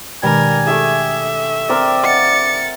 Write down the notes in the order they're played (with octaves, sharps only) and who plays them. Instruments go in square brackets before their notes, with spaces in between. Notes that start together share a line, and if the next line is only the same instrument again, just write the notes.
[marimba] B2 D#3 G#3 [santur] G3 D4 [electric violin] A#4 [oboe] G#5
[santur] A3 G4 G#4 [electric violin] E5
[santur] C4 A#4 G5 [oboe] D5
[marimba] D#5 [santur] E5 F#5 [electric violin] A6 C#7